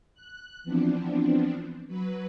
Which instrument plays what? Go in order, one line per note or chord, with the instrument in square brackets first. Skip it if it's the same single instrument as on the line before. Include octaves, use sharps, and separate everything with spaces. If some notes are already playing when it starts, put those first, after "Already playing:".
[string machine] F#6
E3 F3 B3 C4 D4
F#3 B4